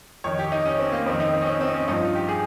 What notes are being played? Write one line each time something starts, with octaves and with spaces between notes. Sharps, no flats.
F2 D#3 C#5
G4
D#4
C#4
C4
A#3
F2 D#3 C4
D#4
C4
C#4
C4
C4
D#4
C#4
G2 F3 D#4
F4
G4
G#4